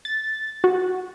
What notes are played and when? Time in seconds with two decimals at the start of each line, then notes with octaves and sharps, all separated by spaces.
0.05 A6
0.64 F#4